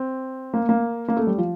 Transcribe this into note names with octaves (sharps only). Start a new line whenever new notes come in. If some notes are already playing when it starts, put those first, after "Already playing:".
Already playing: C4
A#3
A#3
A#3
A3
G3
F3